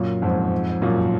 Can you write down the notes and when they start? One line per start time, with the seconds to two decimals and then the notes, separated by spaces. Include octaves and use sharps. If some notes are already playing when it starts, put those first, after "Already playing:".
Already playing: F#2 A#2
0.22 F2 G#2
0.82 F#2 A#2